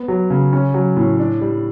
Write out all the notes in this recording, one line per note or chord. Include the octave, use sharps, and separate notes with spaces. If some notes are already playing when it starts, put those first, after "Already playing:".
Already playing: B3
F#3
C#3
C#4
F#3
A2
D4
G3